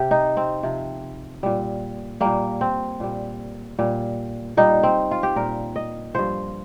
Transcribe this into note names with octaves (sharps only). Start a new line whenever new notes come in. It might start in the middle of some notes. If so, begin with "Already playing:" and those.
Already playing: C3 G4
D#4
C4
C3 F3
A#2 G3
A#2 G3 A#3
C4
A#2 G3
A#2 G3
A#2 G3 D#4
C4
F4
G4
A#2 G3 A#4
D#5
G2 F3 C5